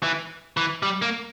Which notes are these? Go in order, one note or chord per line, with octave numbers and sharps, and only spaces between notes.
E3
E3
G3
A#3